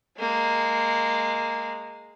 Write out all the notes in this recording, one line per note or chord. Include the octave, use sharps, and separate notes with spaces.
G#3 A#3